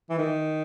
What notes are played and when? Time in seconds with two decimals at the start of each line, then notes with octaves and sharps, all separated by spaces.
0.10 E3
0.18 D#3